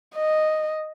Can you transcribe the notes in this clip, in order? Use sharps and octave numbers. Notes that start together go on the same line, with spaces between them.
D#5